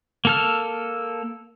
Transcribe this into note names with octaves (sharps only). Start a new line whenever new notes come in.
A#3 A4 F6